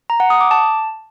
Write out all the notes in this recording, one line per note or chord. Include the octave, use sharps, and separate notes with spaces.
A#5
F#5
D#6
D6
A5